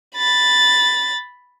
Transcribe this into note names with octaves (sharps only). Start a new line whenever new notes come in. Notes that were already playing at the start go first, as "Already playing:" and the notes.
B5 A6